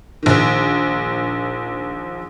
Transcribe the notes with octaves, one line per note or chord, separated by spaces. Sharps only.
A#1 D#3